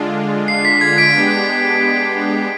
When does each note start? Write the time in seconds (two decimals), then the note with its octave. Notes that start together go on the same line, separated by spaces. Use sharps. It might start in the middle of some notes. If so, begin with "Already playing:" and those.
Already playing: D3 G#3 D4 F4
0.48 C7
0.65 B6
0.81 G#6
0.98 B6 D7
1.15 G#3 B3 D4 G4